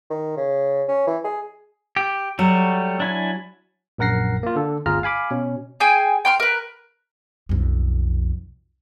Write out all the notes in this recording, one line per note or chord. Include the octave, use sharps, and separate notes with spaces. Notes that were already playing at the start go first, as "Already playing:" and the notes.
D#3
C#3
C#4
E3
G#4
G4
F#3 G3 A3 F#4
D4 E4 G#5
A#1 F#2 A#4 F#5 A#6 C7
A#3 F4
D3 A4
G1 D2 F4 G#4 A#5 F6
F5 G#5 B5 D6
B2 C#4
G#4 G5 G#5 G6
G5 C6 F6
A#4 B4
B1 F2